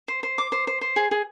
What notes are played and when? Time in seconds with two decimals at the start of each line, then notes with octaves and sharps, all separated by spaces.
0.08 C5
0.23 C5
0.38 D6
0.52 C5
0.67 C5
0.81 C5
0.96 G#4
1.11 G#4